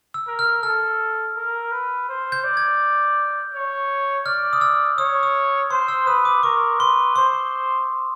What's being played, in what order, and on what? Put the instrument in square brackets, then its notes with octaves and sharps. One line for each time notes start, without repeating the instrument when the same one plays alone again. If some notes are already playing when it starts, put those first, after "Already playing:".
[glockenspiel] E6
[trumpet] A#4
[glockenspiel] F6
[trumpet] A4 [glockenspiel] F6
[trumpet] A#4
B4
C5
[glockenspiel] G6
[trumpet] D5
[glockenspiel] G#6
[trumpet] C#5
[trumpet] D5 [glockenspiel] F6
[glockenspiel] D#6
E6
[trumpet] C#5 [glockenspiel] D#6
[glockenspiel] D#6
[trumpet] C5 [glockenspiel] C6
[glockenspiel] E6
[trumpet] B4 [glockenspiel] D#6
[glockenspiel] D6
[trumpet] A#4 [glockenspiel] C#6
[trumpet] B4 [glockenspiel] C6
[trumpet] C5 [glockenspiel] C6